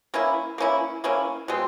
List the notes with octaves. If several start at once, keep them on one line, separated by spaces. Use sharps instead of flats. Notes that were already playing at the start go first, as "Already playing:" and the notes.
A#3 C#4 E4
A#3 C#4 E4
A#3 C#4 E4
B2 G#3 C4